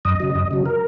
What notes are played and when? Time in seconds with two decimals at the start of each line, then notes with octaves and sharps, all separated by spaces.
0.05 F#2 D#5
0.20 C#3 F#3
0.35 F#2
0.51 C#3 F#3
0.66 A#4